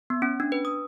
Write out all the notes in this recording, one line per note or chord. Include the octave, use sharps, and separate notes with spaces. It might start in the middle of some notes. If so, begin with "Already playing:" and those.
B3
C#4
D4
B4
D#6